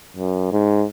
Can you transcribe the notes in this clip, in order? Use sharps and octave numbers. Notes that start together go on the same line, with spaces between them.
F#2
G#2